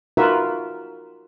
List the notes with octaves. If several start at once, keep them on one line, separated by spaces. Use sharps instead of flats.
D#4 F4 F#4 A#4 B4 E5